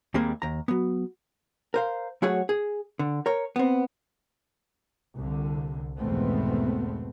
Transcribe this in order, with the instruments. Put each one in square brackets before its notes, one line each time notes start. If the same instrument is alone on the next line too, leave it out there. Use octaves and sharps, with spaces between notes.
[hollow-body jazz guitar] D#2 G3 G#3 A#3 C4
D#2 A#5
F#3 B3
A#4 C5 F5
F#3 A3 F#4 G#4 C#5 F#5
G#4
D3
A#4 C#5
B3 C4
[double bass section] C2 D3
G#1 E2 B2 A3 B3 C4